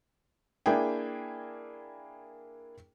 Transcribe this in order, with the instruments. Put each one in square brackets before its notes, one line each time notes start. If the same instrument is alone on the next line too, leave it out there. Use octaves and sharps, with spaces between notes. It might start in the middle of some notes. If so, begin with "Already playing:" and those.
[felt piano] A#3 D4 E4 G#4 G5